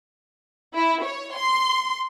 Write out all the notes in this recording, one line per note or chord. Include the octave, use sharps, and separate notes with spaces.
E4
C#5
C6